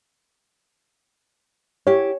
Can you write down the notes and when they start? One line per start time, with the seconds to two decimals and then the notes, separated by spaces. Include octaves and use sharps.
1.87 E4 G4 C#5